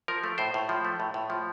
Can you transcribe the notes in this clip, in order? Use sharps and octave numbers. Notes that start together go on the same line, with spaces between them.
F3 A#4
A3
A2 C5
A2
F3
A3
A2
A2
F3